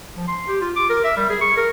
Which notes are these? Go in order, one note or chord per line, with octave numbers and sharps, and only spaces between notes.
F3
C6
G4
F4
D6
A#4
E5
G3
G#4
C#6
A#4